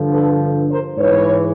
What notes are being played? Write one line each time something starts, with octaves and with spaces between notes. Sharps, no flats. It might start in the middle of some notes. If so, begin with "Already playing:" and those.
Already playing: G2 D3 F3
A4 B4
A#4 C5
G#2 E3 B4 C#5